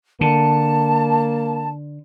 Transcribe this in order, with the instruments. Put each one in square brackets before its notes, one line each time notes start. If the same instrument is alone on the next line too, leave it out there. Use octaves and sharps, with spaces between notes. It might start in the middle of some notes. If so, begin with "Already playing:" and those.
[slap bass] D3 [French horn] A#3 [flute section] A5